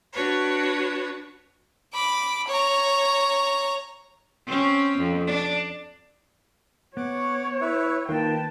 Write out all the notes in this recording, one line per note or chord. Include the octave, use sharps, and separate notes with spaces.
D4 F#4 B4 C#5
B5 D6
C#5 A#5
C4 C#4
F2
D4
B3 C#5 F#5 D6
E4 B4 E5
D#3 A#3 F4 B4 G5 A5